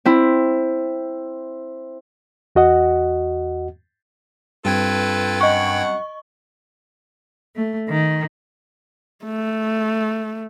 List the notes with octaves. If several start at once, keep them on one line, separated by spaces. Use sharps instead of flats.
C4 E4
E2 F#4 D#5 F#5
G2 G3 C4 F4 A4 B4 G5 G#6
F#2 D#5 F#5 C#6
A3
D#3
A3